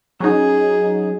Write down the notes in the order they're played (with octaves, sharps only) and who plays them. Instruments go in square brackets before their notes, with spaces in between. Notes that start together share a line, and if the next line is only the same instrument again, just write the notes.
[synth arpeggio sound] F#3 C#4 D#4 [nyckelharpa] G#4